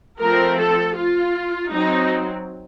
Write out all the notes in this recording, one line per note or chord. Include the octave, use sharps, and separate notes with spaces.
F3 A3 C4 A#4
A4
F4
F#3 C4 D#4